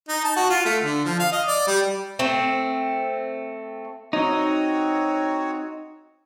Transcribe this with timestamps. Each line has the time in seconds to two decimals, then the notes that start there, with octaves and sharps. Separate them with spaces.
0.08 D#4
0.24 A5
0.36 F#4
0.50 F4
0.65 A3
0.83 D3
1.05 F3
1.19 F5
1.32 D#5
1.47 D5
1.67 G3
2.19 A3 C4
4.13 C4 D#4 F#4 C#5